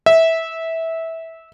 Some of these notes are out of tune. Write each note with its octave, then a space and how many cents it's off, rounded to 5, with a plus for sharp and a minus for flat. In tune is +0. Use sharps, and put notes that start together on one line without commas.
E5 -15